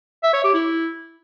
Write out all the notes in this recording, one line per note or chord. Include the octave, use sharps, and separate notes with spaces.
E5
C#5
G4
E4